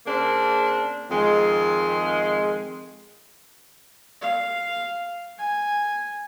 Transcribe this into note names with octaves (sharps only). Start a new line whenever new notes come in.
C#3 A#3 C4 D4
F2 D#3 G#3
F5
G#5